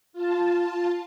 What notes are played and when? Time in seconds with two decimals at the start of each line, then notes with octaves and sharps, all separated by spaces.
0.13 F4 A5